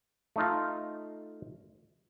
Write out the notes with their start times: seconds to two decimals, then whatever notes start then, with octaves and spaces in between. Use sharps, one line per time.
0.36 A3 D#4 F4